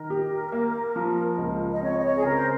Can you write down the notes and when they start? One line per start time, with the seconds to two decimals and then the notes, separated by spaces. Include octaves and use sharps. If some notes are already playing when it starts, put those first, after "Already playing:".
Already playing: D#3 A#4
0.10 G4
0.52 A#3
0.96 F3
1.38 C#2
1.72 D#5
1.81 C4 C#5
1.97 D#5
2.03 C#5
2.15 G#4
2.24 C#3 A#4
2.34 C5